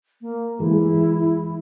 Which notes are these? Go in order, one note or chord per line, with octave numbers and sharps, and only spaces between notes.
A#3
E3 G#3 E4